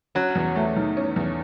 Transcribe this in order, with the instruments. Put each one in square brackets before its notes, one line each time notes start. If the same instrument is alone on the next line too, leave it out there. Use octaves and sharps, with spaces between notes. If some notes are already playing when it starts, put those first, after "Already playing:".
[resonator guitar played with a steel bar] F#3 [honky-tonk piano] C#4
[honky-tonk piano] E2
A3
D#3
C#4
E2